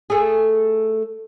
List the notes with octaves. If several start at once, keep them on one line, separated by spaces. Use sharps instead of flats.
A3 G#4